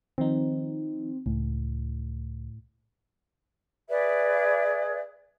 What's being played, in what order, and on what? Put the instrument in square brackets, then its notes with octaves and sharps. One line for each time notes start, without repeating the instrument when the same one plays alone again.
[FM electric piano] D#3 F3 D#4 [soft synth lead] C4
[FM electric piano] C#2 [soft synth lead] A2
[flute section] G#4 B4 D5 E5